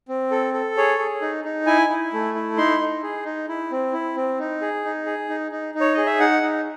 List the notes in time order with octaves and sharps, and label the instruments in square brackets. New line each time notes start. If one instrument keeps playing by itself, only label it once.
[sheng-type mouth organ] C4
A4
A4
G#4 C#5
G#4
D#4
D#4
E4 G#5
E4
A3
E4
D#4 C6
D#4
G#4
D#4
E4
C4
E4
C4
D#4
G#4
D#4
G#4
D#4
D#4
D#4
C#5
G#4 D#5
E5
D#4 F#5
D#4